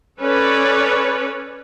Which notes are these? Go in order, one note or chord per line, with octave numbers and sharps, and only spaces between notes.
C#4 A4 B4 C#5 D5